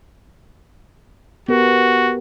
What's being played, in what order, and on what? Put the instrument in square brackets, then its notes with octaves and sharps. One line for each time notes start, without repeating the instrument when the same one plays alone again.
[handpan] B3 G4 A#4 [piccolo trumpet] F#4